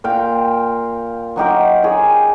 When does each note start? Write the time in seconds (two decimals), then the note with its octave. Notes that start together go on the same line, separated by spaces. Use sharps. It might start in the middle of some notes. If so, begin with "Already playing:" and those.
0.04 A#2 F5 G5
1.36 F#3 D#4 G4 A#4
1.84 G4 G#4 C#5